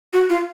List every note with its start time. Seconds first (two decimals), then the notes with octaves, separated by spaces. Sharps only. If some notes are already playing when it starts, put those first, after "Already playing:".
0.13 F#4
0.30 F4